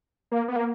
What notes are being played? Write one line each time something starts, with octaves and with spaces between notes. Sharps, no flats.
A#3
B3
A#3